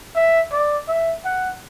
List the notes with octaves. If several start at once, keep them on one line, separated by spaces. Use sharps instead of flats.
E5
D5
E5
F#5